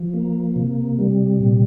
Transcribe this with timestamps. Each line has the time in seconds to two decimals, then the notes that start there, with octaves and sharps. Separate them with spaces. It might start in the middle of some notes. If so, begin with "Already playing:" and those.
Already playing: F3
0.14 A#3
0.56 C3
0.99 G3
1.40 A#2